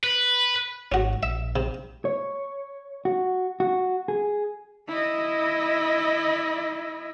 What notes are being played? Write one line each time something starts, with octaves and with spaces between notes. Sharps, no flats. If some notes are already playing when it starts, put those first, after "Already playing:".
B4
G#1 C#4 F#4
A#1 E5
C3
C#5
F#4
F#4
G#4
E4 D#5